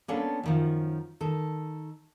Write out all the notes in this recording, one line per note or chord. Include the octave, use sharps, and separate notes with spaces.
A#3 B3 C#4 D4 A4
F#2 D#3 F3
D#3 A4